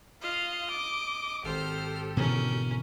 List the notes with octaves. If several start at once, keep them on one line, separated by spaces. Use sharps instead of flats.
F4 D#5 F5
D6
G#1 G4 A4 C5 F6
B2 D3 E3 C#4 A#4